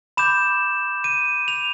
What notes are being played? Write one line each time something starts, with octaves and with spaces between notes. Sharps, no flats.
B5 D6 G6 E7
D#7
F7